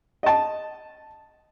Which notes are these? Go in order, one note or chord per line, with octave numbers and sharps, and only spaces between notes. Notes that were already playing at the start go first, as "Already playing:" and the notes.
D#5 A5